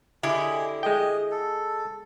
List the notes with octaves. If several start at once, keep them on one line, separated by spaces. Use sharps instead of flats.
D3 E4 G4 G#4 D#5
G#3 D#5 G5
A4